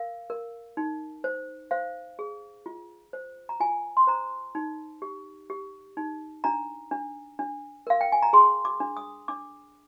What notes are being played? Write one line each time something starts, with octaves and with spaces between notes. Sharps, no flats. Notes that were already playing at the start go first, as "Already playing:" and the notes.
Already playing: A#4 F5
A#4
D#4
C5
C5 F5
G#4
F4
C5
A#5
F4 G#5
C6
C5 A#5
D#4
G4
G4
D#4
D4 A#5
D4
D4
A#4 F5
G5
G#5
A#5
G#4 C6
D6
D4
D#6
D4 D6